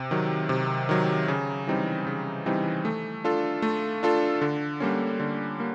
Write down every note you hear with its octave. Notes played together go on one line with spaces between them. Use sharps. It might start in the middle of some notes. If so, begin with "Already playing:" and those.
Already playing: C3
D#3 F#3
C3
D#3 F#3
C#3
E3 G3 C4 D#4
C#3
E3 G3 C4 D#4
A3
D4 F4 A4
A3
D4 F4 A4
D3
G3 A#3 C#4
D3
G3 A#3